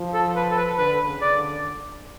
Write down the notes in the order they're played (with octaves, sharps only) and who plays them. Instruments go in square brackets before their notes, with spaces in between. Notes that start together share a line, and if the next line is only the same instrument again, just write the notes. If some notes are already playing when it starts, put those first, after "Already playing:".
Already playing: [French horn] F3
[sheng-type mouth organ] A4
B4
A4
B4
[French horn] D3 [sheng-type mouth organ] B4
[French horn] C#3
[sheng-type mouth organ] D5
[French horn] D3